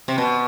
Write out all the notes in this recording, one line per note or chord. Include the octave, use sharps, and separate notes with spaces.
C3
B2